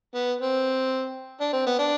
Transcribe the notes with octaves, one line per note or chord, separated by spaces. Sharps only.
B3
C4
D4
C4
B3
D4